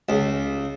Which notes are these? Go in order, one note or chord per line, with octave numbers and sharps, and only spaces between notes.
C#2